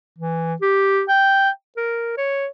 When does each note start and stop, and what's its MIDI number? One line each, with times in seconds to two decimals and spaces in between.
0.18 0.54 52
0.61 1.03 67
1.09 1.49 79
1.76 2.14 70
2.17 2.47 73